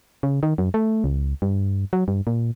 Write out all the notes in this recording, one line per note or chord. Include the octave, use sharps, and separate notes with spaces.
C#3
D#3
F#2
A3
C#2
G2
F#3
G2
A#2